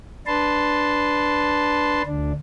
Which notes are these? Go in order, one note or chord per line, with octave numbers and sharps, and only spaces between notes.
D4 B4 A5 C6
D2 D4